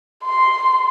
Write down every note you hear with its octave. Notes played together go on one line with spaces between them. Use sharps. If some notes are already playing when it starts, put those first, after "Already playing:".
C6